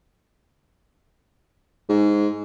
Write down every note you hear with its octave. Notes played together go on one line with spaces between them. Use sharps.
G#2